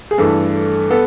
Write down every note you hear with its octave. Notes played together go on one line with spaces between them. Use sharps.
G#4
G2 E3 A3 A4
B3 A4